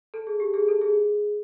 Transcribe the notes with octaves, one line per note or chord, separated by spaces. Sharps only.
A4
G#4
G4
G#4
A4
G#4